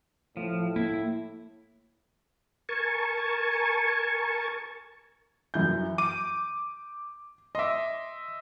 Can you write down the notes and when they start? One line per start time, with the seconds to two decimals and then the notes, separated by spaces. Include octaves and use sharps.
0.37 A2 F3
0.76 A#3 E4
2.69 A#4 G#5 A5 C#6
5.54 F#2 E3 G6
5.98 D6 D#7
7.55 D#5 E5 C6 D6